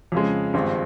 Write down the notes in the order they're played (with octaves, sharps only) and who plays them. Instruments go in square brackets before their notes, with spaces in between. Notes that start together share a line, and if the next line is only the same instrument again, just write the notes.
[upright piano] F2 C#3 G#3
G#1 G2 F3 G#3 C4